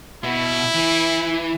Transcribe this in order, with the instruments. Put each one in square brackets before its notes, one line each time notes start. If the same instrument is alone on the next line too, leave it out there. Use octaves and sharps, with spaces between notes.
[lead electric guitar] B2 [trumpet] E4
[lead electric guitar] E3